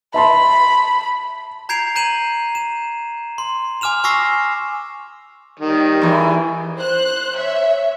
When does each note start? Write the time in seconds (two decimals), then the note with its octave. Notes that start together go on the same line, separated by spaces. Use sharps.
0.14 E5 A5 B5 C6
1.69 A#5 G6 G#6 C7 D7 F7
1.96 A#5 G6 D#7 E7 F#7
2.55 E7
3.38 C6
3.81 G#5 D6 F6 E7 F7
4.04 G#5 C#6 D6 E6 A#6 C7
5.59 D#3 G3
6.02 E2 E3
6.76 C5 F#6
7.37 C#5 E5